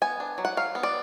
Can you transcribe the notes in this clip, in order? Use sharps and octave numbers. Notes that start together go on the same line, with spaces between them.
B3 G#5
D4
F#3
F#5
F#3 F5
B3
D5